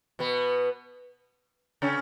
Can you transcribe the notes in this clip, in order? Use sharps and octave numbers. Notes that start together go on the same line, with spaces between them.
B2 B3
C#3 C#4